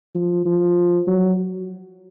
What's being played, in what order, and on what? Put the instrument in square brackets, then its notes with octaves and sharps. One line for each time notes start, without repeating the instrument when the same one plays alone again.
[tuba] F3
F3
F#3